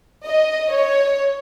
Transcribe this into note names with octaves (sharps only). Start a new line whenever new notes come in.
D#5
C#5